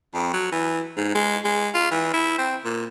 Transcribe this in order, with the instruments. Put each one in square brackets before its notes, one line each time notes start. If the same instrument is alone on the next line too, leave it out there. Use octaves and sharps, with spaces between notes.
[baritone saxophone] F2
F#3
E3
G#2
G#3
G#3
F4
E3
E4
C4
A#2